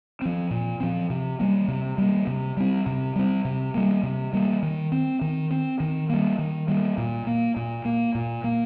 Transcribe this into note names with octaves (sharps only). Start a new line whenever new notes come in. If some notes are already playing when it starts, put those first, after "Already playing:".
F3 C4
A#2
F3 C4
C3
G3 A#3
C3
G3 A#3
C3
G3 C4
C3
G3 C4
C3
G3 A#3
C3
G3 A#3
D#3
C4
D#3
C4
D#3
G3 A#3
D#3
G3 A#3
A#2
A#3
A#2
A#3
A#2
A#3